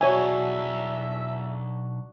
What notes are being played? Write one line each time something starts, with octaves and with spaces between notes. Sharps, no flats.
B1 E2 D4 F#4 C#5 E5 G#5